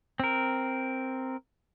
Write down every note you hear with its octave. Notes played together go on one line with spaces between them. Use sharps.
C4 A#4